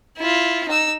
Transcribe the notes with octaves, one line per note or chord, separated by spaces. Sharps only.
E4 F4
D#4 E6